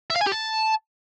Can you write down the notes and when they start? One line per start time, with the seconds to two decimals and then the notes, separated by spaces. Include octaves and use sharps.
0.10 E5
0.16 F5
0.21 G#5
0.26 G4
0.32 A5